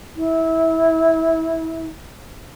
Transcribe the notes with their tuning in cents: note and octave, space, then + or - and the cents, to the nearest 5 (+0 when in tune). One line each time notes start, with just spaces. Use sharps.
E4 -20